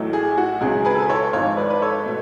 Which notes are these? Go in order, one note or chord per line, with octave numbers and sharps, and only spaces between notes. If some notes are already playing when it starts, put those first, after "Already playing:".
Already playing: A1 A2 F#3 A3
G#4
F#4
C#2 C#3 F#3 G#4
G#4 B4
A4
B4
A4 C#5
G#1 G#2 F3 C#5 F5
B4 D5
B4
A4 C#5
B2 A3